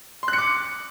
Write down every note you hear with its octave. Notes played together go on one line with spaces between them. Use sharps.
C6
F#6
C#7
D6